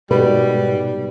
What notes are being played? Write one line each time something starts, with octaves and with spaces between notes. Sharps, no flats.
G#2 B2 G3 B4